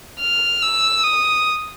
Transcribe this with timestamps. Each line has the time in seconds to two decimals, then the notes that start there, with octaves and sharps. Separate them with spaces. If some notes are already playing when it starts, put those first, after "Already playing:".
0.20 F6
0.62 E6
1.04 D#6